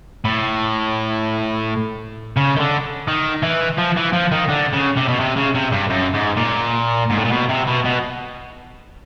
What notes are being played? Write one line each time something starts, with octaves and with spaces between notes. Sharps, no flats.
A2
C#3
D#3
D3
D#3
E3
F3
E3
F3
D#3
D3
C#3
C3
B2
C3
C#3
C3
G2
F#2
G#2
A#2
G#2
A2
A#2
B2
C3
B2
B2